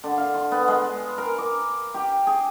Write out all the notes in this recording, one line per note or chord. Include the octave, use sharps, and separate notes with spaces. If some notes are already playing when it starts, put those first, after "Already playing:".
D3
F5
C6
B3
G#3
A#4
D6
G4
G#4